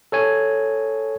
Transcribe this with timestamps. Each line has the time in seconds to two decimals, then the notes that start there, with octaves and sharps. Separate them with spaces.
0.12 A4 C#5 G#5